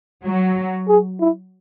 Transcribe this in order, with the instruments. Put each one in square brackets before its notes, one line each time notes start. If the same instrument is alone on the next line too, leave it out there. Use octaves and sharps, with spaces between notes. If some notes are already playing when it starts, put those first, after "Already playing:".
[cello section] F#3
[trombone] G#4
E4